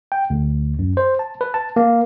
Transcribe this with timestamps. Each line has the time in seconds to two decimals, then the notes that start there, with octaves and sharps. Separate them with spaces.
0.12 G5
0.30 D2
0.79 F#2
0.97 C5
1.19 A5
1.41 B4
1.54 A5
1.76 A#3